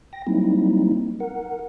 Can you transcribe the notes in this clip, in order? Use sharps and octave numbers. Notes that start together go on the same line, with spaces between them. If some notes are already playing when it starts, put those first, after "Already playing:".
G5 A#6
F#3 G3 A#3 C4 D#4 E4
A#4 F#5